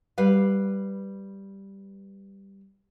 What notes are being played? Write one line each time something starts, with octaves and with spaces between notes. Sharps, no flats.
G3 B4 F5